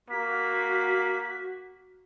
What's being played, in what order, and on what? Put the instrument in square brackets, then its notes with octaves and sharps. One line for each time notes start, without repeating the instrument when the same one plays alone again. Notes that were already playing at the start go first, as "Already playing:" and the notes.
[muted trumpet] A#3 [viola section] F#4 [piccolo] B6